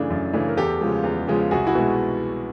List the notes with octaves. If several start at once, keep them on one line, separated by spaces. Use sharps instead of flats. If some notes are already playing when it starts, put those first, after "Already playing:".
Already playing: F#2 C#3 E3 A3 D4
F#2
C#3 E3 A3 D4
A#4
E2 G4 A4
C#3 F3 G#3
E2
C#3 F3 G#3
C2 F#4 G#4
E4 F#4
B2 G#3